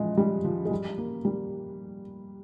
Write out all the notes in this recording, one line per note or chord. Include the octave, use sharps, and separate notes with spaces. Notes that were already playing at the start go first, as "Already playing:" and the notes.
Already playing: E3 F3 G#3
G3
F3
G#3
G3
A#3
G3